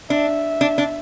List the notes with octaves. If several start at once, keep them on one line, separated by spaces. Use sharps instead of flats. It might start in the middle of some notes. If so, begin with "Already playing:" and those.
D4 E5
D4
D4